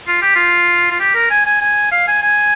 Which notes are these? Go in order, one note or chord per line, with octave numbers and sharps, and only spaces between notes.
F4
G4
F4
F4
G4
A#4
G#5
G#5
G#5
F5
G#5
G#5